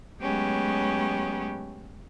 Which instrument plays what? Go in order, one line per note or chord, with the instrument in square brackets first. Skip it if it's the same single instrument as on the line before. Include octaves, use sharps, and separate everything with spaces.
[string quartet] F#3 G#3 A3 B3 C#4 G4